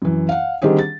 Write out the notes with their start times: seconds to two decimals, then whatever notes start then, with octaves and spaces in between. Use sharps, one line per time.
0.02 F#2 E3
0.29 F5 F#5
0.62 D3 D#3 G3 C4 G4 G#4
0.79 A6